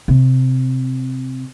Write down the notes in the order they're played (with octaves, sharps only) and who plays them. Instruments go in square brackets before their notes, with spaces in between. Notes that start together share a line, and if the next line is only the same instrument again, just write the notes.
[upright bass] C3